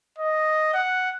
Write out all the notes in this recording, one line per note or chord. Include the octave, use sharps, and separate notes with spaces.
D#5
F#5